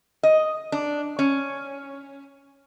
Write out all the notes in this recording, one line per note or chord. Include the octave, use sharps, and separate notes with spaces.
D#5
D4
C#4